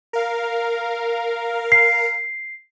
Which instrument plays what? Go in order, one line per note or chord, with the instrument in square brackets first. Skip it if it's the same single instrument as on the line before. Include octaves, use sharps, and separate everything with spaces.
[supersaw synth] A#4 F5
[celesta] C7